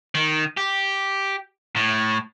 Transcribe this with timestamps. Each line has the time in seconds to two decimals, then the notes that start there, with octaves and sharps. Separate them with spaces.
0.15 D#3
0.57 G4
1.76 A2